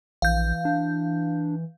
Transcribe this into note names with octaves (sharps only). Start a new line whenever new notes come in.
A#1 E3 F5 G6
D4